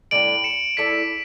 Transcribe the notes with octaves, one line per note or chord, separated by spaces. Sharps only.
A2 G3 D4 D7 F#7
C#7 E7
A3 E4 A4 D5 B6 D7